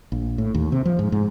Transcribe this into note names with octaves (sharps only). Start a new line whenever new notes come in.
A#1
A2
D#2
C3
F3
G#2
G#2